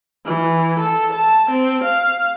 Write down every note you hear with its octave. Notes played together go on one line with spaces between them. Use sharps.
E3
A4
A5
C4
F5